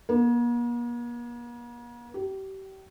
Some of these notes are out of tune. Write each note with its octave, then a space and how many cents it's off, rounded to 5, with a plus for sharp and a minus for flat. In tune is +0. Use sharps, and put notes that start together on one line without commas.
A#3 +45
G4 -30